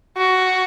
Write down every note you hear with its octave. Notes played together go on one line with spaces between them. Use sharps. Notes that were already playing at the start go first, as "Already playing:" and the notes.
F#4